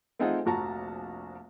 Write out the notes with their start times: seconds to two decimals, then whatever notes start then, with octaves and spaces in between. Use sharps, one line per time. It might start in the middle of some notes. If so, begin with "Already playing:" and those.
0.19 A3 C4 D#4 F4 G#4 F#5
0.45 F1 A#1 F#4 A5 A#5